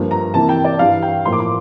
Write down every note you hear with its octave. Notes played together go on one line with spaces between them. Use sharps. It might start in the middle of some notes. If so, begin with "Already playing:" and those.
Already playing: G2 F3 A#3
A#5
C3 E3 A#3 A5
G5
D5
G2 E3 G3 F5
G5
A2 F3 A#3 C6
D6
C6